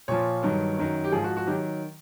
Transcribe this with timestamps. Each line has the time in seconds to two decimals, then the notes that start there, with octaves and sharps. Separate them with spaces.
0.08 A#2 F3 C#5
0.43 G2 D#3 F#3
0.78 F#2 D#3 F#3
1.04 G4
1.12 G#2 F3 G#4
1.24 F#4
1.37 F#4
1.47 D#3 F#3 G4